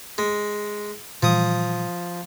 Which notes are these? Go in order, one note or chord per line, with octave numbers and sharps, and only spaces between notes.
G#3
A#2 E3 F3 G3 D#6